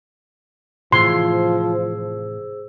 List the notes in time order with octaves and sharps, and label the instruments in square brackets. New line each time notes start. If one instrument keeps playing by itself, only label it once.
[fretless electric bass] A2 C3 E3 [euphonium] F3 [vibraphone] G#4 C5 E6 [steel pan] C6